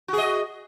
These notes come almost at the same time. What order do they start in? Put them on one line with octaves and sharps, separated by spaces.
F#4 G#4 D#5